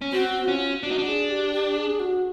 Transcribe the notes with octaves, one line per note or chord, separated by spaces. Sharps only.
C#4
C4 F#4
C#4 F4
D4 F#4
D#4
D4
G#4
G4
G4
G#4
F#4